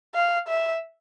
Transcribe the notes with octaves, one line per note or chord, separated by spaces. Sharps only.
F5
E5